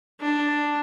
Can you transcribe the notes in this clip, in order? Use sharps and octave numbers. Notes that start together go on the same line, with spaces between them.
D4